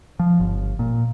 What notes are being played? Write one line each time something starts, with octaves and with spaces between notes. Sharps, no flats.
F3
G1
A#2